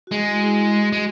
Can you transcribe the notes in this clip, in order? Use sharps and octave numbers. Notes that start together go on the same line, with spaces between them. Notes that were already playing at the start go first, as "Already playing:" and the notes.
F#4
G#3 G#4
E4
E4
F#4
G#3